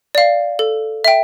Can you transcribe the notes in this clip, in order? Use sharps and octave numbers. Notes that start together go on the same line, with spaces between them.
D5 F5
A4
E5 G5